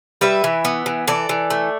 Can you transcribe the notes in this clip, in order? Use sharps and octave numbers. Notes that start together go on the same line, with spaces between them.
G3 B4 E5
E3
B3
E3
E3 A4 D5
E3
A3